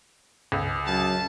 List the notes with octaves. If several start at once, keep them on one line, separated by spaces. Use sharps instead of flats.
C#2
F#2 A5